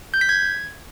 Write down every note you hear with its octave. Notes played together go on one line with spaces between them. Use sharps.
G6
B6
G#6